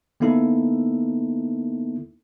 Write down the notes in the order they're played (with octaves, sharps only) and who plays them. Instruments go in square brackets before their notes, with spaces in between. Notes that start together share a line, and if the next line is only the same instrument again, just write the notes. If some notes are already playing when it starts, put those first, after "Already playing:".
[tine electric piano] D3 A#3 B3 D#4 E4 A4